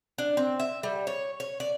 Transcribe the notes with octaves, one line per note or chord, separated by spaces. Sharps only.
D4
C4
E5
G3
C#5
C#5
D5